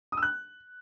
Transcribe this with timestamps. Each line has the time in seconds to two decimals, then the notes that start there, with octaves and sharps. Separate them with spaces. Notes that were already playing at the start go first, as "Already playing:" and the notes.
0.12 D#6
0.17 E6
0.23 F#6